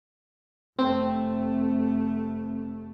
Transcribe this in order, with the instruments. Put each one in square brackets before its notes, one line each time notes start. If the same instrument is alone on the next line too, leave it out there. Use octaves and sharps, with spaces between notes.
[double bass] F1 A3 [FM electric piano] C4